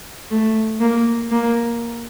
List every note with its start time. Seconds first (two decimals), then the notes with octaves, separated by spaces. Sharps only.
0.31 A3
0.81 A#3
1.32 A#3